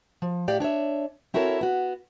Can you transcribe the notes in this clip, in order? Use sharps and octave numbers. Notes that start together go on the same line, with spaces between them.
F3
A2 G4 D5 F5
D4 C#5 D5 E5
C4 E4 F#4 A4 A#4 C#5
B3 F#4